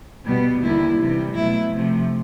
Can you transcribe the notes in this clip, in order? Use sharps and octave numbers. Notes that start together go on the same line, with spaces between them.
B2 G3 B3
D#2 D3 G3 E4
C3 E3 G3
B2 F#3 A3 E4
C3 F3 A3